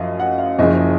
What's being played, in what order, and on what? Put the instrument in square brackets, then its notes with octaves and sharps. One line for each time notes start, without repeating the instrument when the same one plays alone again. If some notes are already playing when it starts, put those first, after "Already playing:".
Already playing: [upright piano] F#2 F3 D#5 F5
F#5
F5
F#1 F#2 C#3 F3 D#5